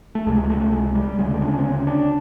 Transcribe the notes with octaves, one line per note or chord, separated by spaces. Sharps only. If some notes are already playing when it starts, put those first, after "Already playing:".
A3
C#2 C3 G#3
A3
G#3
G3
D2 C#3 G#3
A3
D4
C#4
C4
C#4
C#4
D4